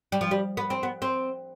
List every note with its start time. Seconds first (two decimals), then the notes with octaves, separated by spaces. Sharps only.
0.12 G3
0.21 F3
0.31 G3
0.57 B3
0.70 C4
0.83 B3
1.02 C4